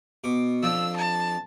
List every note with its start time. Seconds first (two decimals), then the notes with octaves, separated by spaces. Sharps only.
0.24 B2 D6
0.63 F2 F3 D4 E6
0.96 A5